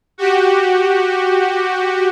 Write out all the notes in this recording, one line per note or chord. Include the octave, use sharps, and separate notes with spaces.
F#4 G4